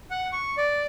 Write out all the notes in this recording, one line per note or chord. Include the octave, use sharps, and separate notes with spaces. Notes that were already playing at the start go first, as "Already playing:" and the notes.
F#5
C#6
D5